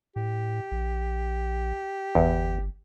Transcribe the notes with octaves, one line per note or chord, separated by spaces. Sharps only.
A2 G4
A#1
G1 E2